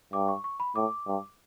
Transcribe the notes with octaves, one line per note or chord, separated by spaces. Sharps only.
G2 D6
C#6
C#6
B5
A2 D6
G2